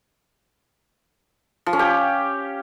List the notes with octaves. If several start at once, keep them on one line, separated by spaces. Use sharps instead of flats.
F3
C#4
G4